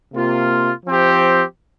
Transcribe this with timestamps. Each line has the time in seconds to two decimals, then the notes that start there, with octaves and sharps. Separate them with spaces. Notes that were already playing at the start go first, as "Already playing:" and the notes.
0.14 C3 A#3 F4
0.86 F3 C4 G4